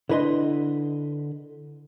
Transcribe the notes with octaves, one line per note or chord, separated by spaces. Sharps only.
D3 E4 B4 D#5 C6